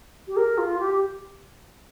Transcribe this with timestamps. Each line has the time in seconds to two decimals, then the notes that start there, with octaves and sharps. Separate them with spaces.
0.27 G4
0.36 A#4
0.57 F4
0.78 G4